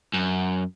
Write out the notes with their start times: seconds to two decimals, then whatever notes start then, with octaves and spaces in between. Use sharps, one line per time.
0.14 F#2